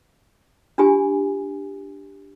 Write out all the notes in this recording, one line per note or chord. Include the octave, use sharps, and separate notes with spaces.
D4 F4 G4 G#5